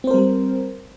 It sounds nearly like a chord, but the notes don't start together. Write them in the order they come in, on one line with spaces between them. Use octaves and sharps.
C4 C5 A#4 G3